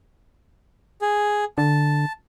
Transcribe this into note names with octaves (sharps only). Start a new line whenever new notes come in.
G#4
D3 A5